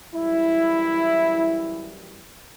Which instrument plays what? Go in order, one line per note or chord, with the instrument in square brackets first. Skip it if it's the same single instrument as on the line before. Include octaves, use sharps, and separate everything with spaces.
[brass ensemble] F#2 E3 G3 E4